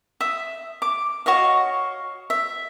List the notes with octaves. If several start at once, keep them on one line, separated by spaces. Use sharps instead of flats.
E5 D#6
D6
F#4 C#5 D#5 F5
E5